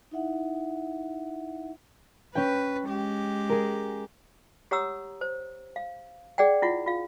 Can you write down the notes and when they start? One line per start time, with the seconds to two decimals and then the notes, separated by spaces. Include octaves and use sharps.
0.11 D#4 E4 E5 F#5
2.35 C#4 B4 G5
2.87 G#3 G4
3.49 G#4 A#4
4.71 G4 C#5 F#5 A#5 D#6 E6
5.21 C5
5.76 F5
6.38 G#4 D5 F#5 G5
6.62 E4 F4 F#5
6.86 F4 F5